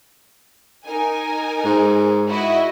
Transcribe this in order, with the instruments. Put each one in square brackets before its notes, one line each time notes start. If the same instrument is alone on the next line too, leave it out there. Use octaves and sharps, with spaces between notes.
[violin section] D#4 A#4 G#5
[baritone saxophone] G#2
[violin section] E4 F#4 D#5